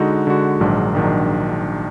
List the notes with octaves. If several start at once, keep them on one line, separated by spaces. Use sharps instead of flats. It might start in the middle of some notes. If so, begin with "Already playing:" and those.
Already playing: D3 G#3 D#4 F#4
D3 G#3 D#4 F#4
A#1 G#2 D#3 F#3 D4
A#1 G#2 D#3 F#3 D4